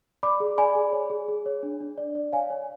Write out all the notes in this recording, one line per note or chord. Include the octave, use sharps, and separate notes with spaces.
D5 B5 D6
G#4
D5 G#5 B5
G#4
C#5
G#4
G#4
C#5
D4
D4
D5
D5
C#5 F5 G#5
C#5